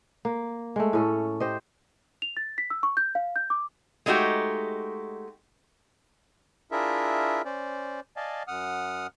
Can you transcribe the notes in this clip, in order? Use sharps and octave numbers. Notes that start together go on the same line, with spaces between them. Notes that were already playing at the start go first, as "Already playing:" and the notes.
A#3
G#3 A3
A2 C#4 A4
G4 C5 D#5
F7
A6
B6
E6
C#6
G6
F5
G6
D6
G#3 A3 D#4 F#4 G4
D4 E4 F4 G#4 A#4 E5
C#4 C5 D5
D5 D#5 F5 G#5 A5
F#2 F#5 D#6 F6